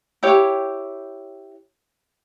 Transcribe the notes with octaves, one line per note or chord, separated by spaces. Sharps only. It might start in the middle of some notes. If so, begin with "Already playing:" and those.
E4 G4 C#5